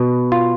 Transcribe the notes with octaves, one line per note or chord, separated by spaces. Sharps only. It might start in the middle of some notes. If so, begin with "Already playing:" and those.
Already playing: B2
F4